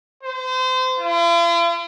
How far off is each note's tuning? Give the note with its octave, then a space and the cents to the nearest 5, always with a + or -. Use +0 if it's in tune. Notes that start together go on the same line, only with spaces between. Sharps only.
C5 -30
F4 -45